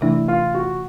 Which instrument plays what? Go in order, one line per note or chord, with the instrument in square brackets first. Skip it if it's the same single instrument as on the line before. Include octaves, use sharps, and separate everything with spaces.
[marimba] C3 E3 A3 D4 [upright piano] E4
[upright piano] F4
F#4